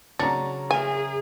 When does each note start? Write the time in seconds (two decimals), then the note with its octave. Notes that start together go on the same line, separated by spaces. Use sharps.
0.19 C#3 F#3 D4 A#5 C#6 A6
0.71 G#4 A#4 E5 G#5